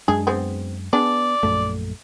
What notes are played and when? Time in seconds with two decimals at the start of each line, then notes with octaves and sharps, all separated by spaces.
0.08 F#2 G#3 D4 G#4
0.27 B3 C4 G#4
0.93 B3 D4 G#4 D5
1.43 A#1 F#2 A3